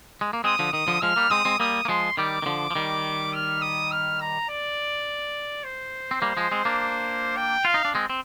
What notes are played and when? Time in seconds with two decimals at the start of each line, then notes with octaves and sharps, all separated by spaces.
0.21 G#3
0.33 A#3
0.44 G#3 C4 D#6
0.59 D3 F3
0.73 D#3 D#6
0.88 D3 F3
1.02 F3 G#3 F6
1.16 G3 A#3
1.31 G#3 C4 D#6
1.45 G#3 C4
1.60 G3 A#3 D#6
1.85 A#3
1.88 F3 G#3 C6
2.17 D#3 G3 D6
2.42 D#3
2.46 D3 F3
2.71 F3
2.75 D#3 G3
3.34 F6
3.62 D#6
3.92 F6
4.21 A#5
4.49 D5
5.64 C5
6.11 C4
6.22 G3 A#3
6.37 F3 G#3
6.51 G#3 C4
6.65 A#3 D4
7.37 G5
7.65 F4 F5
7.74 D#4
7.85 D4
7.95 G#3 C4
8.10 C4